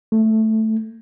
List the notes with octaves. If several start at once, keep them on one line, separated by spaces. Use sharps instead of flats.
A3